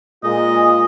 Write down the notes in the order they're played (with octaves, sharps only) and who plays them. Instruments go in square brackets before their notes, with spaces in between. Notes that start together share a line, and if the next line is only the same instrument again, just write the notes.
[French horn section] A#2 G#3 F4 [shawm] D#5